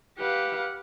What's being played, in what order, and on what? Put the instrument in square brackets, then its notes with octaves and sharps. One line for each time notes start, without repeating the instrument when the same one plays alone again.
[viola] G4 F#5 [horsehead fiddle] B4 F5